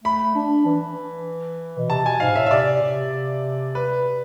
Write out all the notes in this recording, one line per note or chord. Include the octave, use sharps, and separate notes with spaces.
A3 B5
D4
E3
B2
C3 A5
B2 G#5
G#2 F5
A2 E5
E5
C3 D5
C3
B4